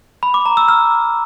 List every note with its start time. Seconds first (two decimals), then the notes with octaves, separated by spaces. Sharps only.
0.23 B5
0.34 D6
0.46 A#5
0.57 E6
0.68 F6